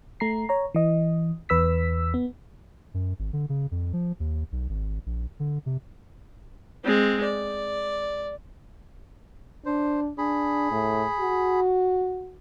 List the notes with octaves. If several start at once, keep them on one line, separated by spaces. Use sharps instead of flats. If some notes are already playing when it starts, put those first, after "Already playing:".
A3 A#5 C7
C#5 A#5
E3 D#5
E2 B4 E6 B6
B3
F#2
G#1
D3
C#3
F2
F3
D#2
B1
G#1
A#1
D3
C3
G#3 C4
D5
D4 C5
D4 G#4 B5
A2
F#4